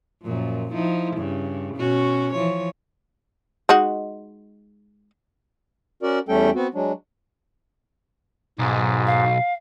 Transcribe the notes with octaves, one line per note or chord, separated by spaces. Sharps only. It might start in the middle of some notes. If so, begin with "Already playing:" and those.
F#2 A#2 F3
F3 D#4 E4
G2 C#3
B2 C#4 F#4
E3 F3 C#5
G#3 D#4 F#4
C#4 F#4 A#4 D5
E2 G3 A3 C#4 A4 G5
B3 C4 F#4
F#3 G#3 D4
B1 G#2
F5